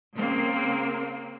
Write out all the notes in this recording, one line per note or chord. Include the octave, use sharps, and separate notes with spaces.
C#3 A#3 C4